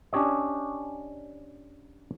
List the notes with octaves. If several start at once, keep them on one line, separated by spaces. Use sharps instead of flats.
C#4 D4 G4 C#5 D#5